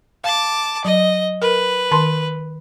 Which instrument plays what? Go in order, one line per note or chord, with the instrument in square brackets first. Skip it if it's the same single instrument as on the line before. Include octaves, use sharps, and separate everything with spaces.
[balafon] F5 [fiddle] A5 D6
[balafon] F#3 [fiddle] D#5
[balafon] A#4 [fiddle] B4
[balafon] D#3 A5 C6